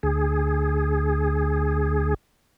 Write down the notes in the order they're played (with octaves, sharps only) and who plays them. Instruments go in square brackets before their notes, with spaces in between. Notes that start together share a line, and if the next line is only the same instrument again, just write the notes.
[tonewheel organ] D2 G#4